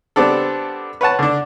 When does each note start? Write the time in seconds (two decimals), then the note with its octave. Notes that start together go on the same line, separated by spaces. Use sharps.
0.16 G3 B3 C4 D4 A4
1.01 B4 C#5 F#5 A5
1.19 D3 D4